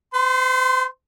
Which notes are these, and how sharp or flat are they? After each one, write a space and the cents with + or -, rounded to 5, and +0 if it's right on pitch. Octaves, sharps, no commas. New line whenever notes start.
C5 -40 C6 +0